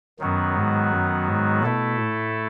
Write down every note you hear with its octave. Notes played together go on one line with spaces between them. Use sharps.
F#2 D#3 F#3 B3 F#4
G#2
F#2
G#2
B2 A3 E4 A4
A2